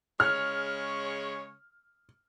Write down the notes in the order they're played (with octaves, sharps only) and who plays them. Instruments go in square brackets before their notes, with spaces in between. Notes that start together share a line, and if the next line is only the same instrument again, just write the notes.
[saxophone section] C#3 G#3 C#5 [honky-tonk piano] F6